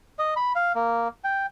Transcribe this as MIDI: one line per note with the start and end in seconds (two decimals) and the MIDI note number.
0.19 0.34 75
0.36 0.53 83
0.55 0.72 77
0.75 1.08 58
1.24 1.46 79